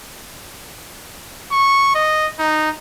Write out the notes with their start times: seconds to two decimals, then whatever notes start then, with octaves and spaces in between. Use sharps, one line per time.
1.52 C#6
1.95 D#5
2.39 D#4